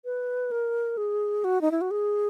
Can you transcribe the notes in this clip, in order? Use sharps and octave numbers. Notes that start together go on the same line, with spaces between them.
B4
A#4
G#4
F#4
D#4
E4
F#4
G#4